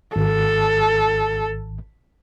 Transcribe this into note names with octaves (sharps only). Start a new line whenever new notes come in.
G#1 A4